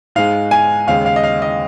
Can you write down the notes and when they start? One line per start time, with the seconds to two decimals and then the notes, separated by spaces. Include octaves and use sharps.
0.15 G#2 G#3 F5
0.51 G#5
0.87 D#2 C#3 G#3 F5
1.06 F5
1.16 D#5
1.24 F5
1.42 D#5